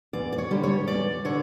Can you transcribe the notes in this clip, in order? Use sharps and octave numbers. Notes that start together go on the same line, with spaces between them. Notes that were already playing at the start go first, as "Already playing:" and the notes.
E2 D5
D5
C#5
D3 G3
C#5
E2 D5
D3 C#5